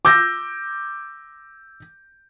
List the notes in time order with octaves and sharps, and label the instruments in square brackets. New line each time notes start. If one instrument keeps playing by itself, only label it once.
[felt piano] D6 E6 G6 A#6